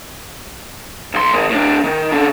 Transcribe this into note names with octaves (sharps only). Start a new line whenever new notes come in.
B1 C6
D#3 G#3
A2 D4
D#3
C#3 D4